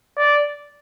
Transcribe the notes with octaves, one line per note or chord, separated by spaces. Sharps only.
D5